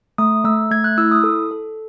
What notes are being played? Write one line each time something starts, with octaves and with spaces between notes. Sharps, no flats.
A3 D#6
A3 E6
A3 G#6
F#6
E4 E6
D#6
A4
A4